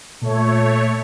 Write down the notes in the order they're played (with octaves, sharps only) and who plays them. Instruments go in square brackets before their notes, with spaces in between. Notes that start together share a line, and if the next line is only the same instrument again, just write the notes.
[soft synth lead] A#2 [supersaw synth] A3 C#5